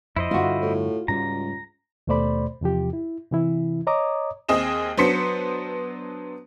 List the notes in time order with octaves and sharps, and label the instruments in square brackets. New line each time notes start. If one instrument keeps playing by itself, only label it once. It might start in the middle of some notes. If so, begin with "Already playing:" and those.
[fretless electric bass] F2 [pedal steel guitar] E4 C5 D#5
[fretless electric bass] G2 D3 [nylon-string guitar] F4 F#4
[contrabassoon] A2
[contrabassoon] C#2 [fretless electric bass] G#2 G3 [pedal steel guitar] A#5
[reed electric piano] D#2 B2 A3 C5 D5 B5
E2 C3 F3 G4
E4
C3 E3 E4
C#5 D#5 A#5 D6 D#6
[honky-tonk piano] D#2 C4 G#4 D#5 E7
F#3 B3 D4 C5 B6 C#7